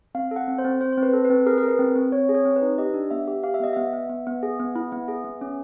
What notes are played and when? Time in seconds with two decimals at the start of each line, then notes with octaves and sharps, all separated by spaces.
0.15 C4 F5
0.31 A4
0.36 F#5
0.48 C4
0.58 C5
0.64 C4
0.80 C4 C5
0.92 C4 C5
1.03 B4
1.13 A4
1.25 B4
1.30 C4
1.46 G#4 A#4
1.58 G#4 A#4
1.68 B4
1.79 C4
1.95 C4
2.12 C4 C#5
2.29 G#4
2.35 C#5
2.45 C4
2.56 B4
2.62 D#4
2.78 G4 D#5
2.94 D4
3.11 B3 E5
3.28 G4
3.43 G4 F5
3.54 E5
3.60 B3 D#5
3.73 B3 E5
3.93 B3
4.09 B3
4.27 B3
4.43 G#4
4.60 B3
4.75 E4
4.92 B3
5.08 G#4
5.25 B3
5.41 C#4